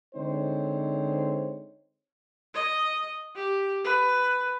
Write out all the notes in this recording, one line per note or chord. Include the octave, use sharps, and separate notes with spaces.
D3 G#3 C4 D#4 C5 C#5
D#5
G4
B4